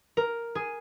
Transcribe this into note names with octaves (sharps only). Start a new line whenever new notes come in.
A#4
G#4